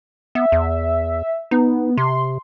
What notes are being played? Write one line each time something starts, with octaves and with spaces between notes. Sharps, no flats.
B3 E5
E2
B3 D#4
C3 C6